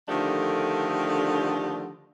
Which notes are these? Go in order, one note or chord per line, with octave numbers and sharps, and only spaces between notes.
D3 D#3 F3 A3 D4 G4